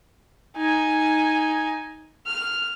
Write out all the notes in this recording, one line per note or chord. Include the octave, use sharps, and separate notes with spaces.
D#4 G#5
F6